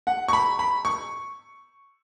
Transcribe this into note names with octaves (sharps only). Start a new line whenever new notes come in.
F#5
C#6
B5
B5
C#6